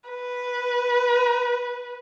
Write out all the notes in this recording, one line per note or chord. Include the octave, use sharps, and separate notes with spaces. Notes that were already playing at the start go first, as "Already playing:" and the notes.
B4